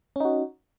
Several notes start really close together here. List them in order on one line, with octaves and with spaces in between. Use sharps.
C#4 D#4 F#4